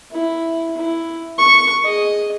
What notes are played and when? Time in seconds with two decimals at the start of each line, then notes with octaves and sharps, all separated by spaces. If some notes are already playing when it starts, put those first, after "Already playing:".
0.12 E4
0.77 E4
1.38 C#6
1.83 G#4 D#5